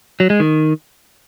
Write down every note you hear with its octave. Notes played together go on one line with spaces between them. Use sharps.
F#3
G#3
D#3